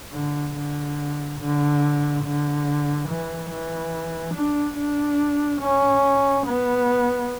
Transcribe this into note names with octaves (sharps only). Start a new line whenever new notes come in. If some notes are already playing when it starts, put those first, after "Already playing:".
D3
D3
D3
D3
E3
E3
D4
D4
C#4
B3